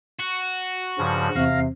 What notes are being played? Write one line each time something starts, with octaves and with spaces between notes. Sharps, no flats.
F#4
G2 C#3 F3
E2 C3 C4 F5 A#6